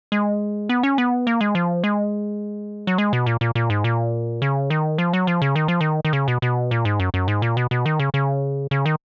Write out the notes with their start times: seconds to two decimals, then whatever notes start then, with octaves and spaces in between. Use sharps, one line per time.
0.12 G#3
0.69 B3
0.83 C#4
0.98 B3
1.27 A#3
1.41 G#3
1.55 F3
1.84 G#3
2.87 F#3
2.98 G#3
3.13 B2
3.26 A#2
3.41 A#2
3.55 A#2
3.70 G#2
3.84 A#2
4.42 C#3
4.70 D#3
4.98 F3
5.13 F#3
5.27 F3
5.42 C#3
5.56 D#3
5.68 F3
5.81 D#3
6.05 D#3
6.13 C#3
6.28 B2
6.42 B2
6.71 A#2
6.85 G#2
7.00 F#2
7.14 F#2
7.28 G#2
7.42 A#2
7.57 B2
7.71 B2
7.86 D#3
7.99 C#3
8.14 C#3
8.71 C#3
8.86 D#3